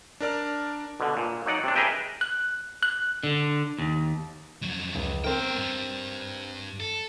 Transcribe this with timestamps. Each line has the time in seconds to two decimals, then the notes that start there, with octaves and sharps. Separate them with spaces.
0.20 D4 A#4 D5 F6
1.00 B2 D3
1.17 A#2
1.46 F#3 D#4 D5 F#5
1.64 C3 D4
1.76 G#4 A#4 B4 D#5 E5 G5
2.21 F#6
2.83 F#6
3.23 D3
3.79 D#2
4.62 F2 F#3
4.95 C#2
5.24 B3 C4 A#4 G5
5.57 G2 G3
6.80 A4